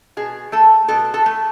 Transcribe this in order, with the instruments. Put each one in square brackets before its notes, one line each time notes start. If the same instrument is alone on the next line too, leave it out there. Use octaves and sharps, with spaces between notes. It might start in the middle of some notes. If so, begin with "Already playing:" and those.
[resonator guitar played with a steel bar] B2 G#4
A3 A4
B2 A4
A4
A3